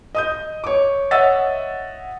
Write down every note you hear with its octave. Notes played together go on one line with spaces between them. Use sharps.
D#5 D#6 G6
C#5 D6
C#5 D#5 E5 F#5 E6 A6